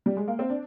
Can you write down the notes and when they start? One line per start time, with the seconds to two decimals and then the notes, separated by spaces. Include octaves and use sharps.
0.06 G3
0.17 G#3
0.28 A#3
0.39 C4
0.50 D4